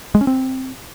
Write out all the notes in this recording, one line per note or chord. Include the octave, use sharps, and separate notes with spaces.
G#3
C#4
C4